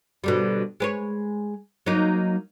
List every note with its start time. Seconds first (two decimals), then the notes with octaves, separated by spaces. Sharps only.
0.24 B2 D3 G3
0.80 G#3 B4 C#5
1.86 F#3 A#3 D#4